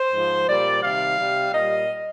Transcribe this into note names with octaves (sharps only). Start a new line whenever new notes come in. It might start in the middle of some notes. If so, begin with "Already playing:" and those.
Already playing: C5
G#2 F3
A#2 G3 D5
C3 D#3 G3 F5
C3 G3
A#2 G3 D#5